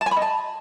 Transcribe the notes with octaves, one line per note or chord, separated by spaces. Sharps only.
A5
G#5
B5
D#5
A5